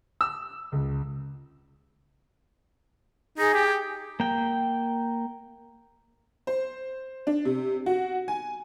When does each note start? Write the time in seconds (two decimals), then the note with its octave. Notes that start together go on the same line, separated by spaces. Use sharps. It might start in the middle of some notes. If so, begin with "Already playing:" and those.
0.21 E6
0.72 C#2
3.38 D#4 G#4
3.54 G4
4.20 A#3 G5
6.47 C5
7.27 D4
7.45 C3
7.86 F#4
8.28 G#5